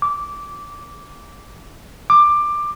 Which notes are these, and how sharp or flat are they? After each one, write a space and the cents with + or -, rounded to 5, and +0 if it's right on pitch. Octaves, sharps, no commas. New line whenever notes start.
D6 -15
D6 +15